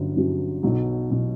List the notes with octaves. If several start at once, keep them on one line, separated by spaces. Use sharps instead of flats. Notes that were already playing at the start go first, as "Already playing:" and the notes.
Already playing: G1 G2 F#3 C#4
G1 G2 F#3 C#4 F#4
B1 B2 F#3
B2 F#3